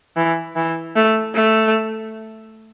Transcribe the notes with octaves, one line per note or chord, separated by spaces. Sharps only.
E3
E3
A3
A3